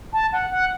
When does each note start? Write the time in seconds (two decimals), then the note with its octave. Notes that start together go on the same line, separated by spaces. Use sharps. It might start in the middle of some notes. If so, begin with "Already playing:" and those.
0.13 A5
0.33 F#5
0.51 F#5